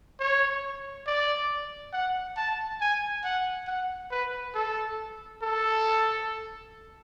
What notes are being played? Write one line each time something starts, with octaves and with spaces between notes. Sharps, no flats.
C#5
D5
F#5
A5
G#5
F#5
F#5
B4
A4
A4